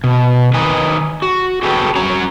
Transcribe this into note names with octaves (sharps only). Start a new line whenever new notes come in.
B2
D#3 D#4 B4 G#5
F#4
F#4 G#4 A4 B4 G5
C#4 F#4 A#5